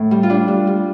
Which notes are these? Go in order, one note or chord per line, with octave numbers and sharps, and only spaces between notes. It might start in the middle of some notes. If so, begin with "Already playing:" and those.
Already playing: A2
G3
F4
G3 D4
G3
G3